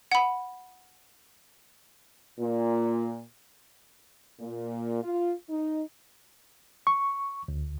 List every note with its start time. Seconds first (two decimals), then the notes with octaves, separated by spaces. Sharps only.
0.12 F#5 B5
2.40 A#2
4.40 A#2
5.03 F4
5.49 D#4
6.87 C#6
7.48 D2